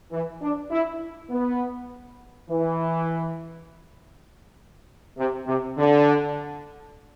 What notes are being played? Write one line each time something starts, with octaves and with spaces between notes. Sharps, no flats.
E3
D4
E4
B3
E3
C3
C3
D3